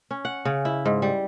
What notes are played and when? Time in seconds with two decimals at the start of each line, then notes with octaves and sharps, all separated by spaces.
0.11 C#4
0.25 F#5
0.45 C#3
0.65 E4
0.86 G#2
1.02 G3